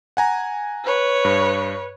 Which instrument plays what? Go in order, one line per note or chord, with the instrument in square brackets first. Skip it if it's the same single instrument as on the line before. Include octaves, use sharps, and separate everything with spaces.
[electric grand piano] F#5 G#5 A#5
[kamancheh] B4 C#5
[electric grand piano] G2